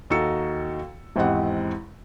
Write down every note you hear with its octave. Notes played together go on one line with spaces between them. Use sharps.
D#2 D#4 F#4 A4 E6 C#7
G#1 E2 C4 G4 D#5 F#5